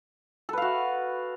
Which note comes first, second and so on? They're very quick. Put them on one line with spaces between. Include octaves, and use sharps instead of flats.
A4 B4 F5 F#4